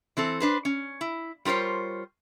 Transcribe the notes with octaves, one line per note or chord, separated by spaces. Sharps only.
E3 C4 A4
D4 B4 C5
C#4
E4
G3 F4 A#4 C5 C#5